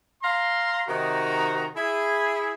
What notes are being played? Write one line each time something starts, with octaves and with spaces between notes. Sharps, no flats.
F5 A#5 C6
C3 D#3 D#4 F#4 A#5
E4 G#4